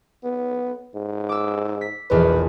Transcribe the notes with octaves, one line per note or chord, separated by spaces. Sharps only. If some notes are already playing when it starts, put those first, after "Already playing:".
B3
G#2
D6 E6
B6
E1 A#1 E2 B4